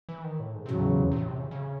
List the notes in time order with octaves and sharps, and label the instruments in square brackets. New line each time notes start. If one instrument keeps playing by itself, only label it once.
[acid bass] E3
D#3
A2
G#2
C3
[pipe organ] E2 C#3 F#3 [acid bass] A2
[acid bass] C3
C3
A2
C3
C#3
C#3